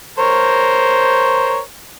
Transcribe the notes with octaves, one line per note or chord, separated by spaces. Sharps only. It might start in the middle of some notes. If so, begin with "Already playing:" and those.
A#4 C5 C#5